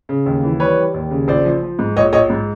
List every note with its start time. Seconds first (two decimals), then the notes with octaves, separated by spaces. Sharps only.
0.09 C#3
0.26 D#2
0.43 E3
0.60 G3 B4 C#5
0.78 G3
0.94 D#2
1.11 C#3
1.28 A#1 C5 D5
1.45 F3
1.63 F3
1.79 G#2
1.96 A#1 C#5 D#5
2.13 A#1 C#5 D#5
2.30 G#2